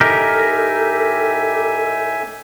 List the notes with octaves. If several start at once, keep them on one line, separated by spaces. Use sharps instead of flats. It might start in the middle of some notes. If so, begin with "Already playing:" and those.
A2 D#4 G4 A4 A#4 E5 G#5